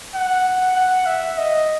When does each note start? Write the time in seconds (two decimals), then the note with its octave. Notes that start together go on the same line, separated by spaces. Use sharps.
0.14 F#5
0.76 F#5
1.07 E5
1.38 D#5